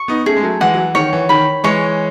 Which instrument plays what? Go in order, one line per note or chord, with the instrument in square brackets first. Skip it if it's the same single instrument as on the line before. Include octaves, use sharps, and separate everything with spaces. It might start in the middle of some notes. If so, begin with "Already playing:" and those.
Already playing: [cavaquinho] C#6
[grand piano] B3 D#4
[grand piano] A3 C#4 [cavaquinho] G#4
[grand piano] G#3
F#3 A3
[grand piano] E3 G#3 [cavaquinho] F#5
[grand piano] F#3
E3
[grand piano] D#3 [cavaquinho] C#5
[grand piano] E3
[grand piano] D#3 [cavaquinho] B5
[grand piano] E3 G#3 [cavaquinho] C#5